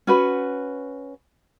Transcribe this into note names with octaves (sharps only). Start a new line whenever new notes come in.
C#4 F#4 B4